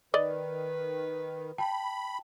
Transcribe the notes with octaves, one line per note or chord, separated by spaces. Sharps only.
D#3 B4 D5 D#5
G5 A5 B5